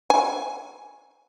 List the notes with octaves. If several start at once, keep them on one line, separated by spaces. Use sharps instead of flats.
G#5